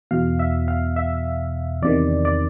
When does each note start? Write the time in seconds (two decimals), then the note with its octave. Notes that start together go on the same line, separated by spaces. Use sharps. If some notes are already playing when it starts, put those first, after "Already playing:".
0.11 E2 B2 F5
0.39 E5
0.68 F5
0.96 E5
1.82 E2 C3 D#3 D5
2.25 D5